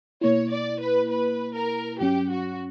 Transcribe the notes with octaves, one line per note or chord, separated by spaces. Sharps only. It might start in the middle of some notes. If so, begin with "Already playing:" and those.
B2 A#3 E4 C#5
D5
B4
B4
A#4
G2 F#3 C#4 G4
F#4